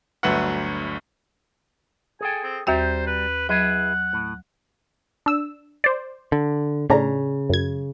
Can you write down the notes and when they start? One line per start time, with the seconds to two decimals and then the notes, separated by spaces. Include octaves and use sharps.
0.23 G1 D2 F#3 B4 E5 F#5
2.21 G#4 A4 G5 G#5
2.43 C4
2.67 D#2 G3 F#4 C5 G5 A#5
3.07 B4
3.49 F#3 E4 G#4 B4 F#5
4.13 A2
5.26 D4 E6
5.84 C5 D5
6.32 D3
6.90 A2 C#3 D4 A#5
7.49 F#2 G#6